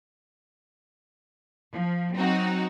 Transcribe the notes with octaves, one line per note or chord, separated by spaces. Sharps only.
F3
F#3 C4 D#4 F#4